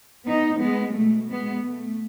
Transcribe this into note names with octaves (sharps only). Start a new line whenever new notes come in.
B3 D#4
G#3 B3
B2 G#3 A3
G#3 B3
A3